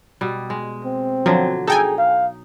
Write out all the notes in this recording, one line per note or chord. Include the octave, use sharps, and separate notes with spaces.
B2 G3
G#3
C4
D3 F3 F#3
D#4 G#4 A4 G5 G#5
F5